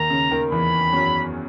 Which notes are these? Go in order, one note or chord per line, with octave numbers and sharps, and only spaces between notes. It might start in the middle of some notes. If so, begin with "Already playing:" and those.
Already playing: D#2 D#3 A#5
C#3
D#2 D#3
E2 E3 B5
F#2 F#3